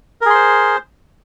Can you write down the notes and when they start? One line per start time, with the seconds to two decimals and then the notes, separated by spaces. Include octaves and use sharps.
0.21 A#4
0.26 G#4
0.30 C6
0.34 C5